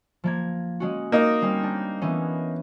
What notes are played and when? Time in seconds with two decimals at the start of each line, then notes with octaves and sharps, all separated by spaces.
0.24 F3 A#3 G#6
0.80 G#3 C#4 F#4
1.12 A#3 D#4 D#6 A#6 D7
1.42 G3 C4 C#4
1.63 D4
2.02 E3 B3 C#4